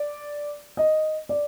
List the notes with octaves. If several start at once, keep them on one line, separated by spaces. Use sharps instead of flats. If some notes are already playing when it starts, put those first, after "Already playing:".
Already playing: D5
D#5
D5